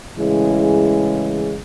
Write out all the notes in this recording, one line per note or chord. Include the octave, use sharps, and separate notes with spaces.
A2 C#3 E3 G#3